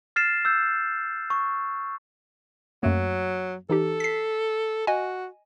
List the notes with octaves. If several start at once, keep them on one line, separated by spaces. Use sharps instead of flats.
F6 A6 C7 E7
E6 G6
C#6
F#2 F#3 A3 A#3
E3 D#4 G4 A4
B6 C7
F#4 D#5 G#5